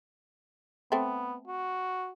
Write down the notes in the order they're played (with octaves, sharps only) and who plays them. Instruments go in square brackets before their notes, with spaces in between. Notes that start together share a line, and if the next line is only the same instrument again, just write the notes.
[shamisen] A3 C4 [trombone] B3
[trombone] F#4